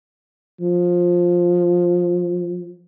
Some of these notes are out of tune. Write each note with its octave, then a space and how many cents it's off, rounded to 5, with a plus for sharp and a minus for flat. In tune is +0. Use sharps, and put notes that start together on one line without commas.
F3 +10